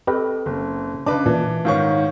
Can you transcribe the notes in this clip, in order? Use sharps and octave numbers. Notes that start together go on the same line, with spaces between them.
C4 G4 A4 B4 D#5
F#1
C#3 D4 B4 D#5 D6
A#2 E3 A5
G#2 D#3 C#5 F5 C#6